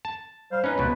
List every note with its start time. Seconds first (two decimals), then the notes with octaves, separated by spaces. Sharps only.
0.05 A5
0.52 G3 C5 F5
0.64 C#4 D#4 B4
0.78 C#2 B2